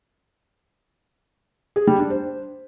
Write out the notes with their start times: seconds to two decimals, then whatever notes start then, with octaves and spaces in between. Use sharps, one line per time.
1.76 G#4
1.87 G3
1.99 D4
2.10 C5